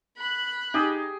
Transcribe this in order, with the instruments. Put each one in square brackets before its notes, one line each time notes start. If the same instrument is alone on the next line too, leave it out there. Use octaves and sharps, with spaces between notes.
[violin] B5 F#6
[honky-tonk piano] D#4 [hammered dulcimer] G4 G#4